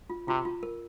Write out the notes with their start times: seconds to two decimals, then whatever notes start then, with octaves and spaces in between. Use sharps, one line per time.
0.10 F4
0.28 C3 F4
0.45 F4
0.63 A#4